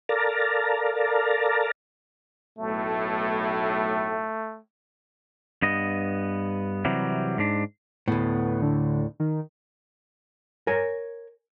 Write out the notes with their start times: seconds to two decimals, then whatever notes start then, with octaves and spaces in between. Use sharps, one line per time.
0.09 A4 A#4 D5 F5 A5 A#5
2.59 B1 A2 A3
5.62 G2 B3 D#5
6.85 C3 E3 F#3 G3
7.38 G#2 D4
8.08 D2 A2 B3
8.62 D3
9.20 D#3
10.67 A#4 C#5 G#5